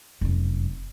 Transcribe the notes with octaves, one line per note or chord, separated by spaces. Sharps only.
F1 F#2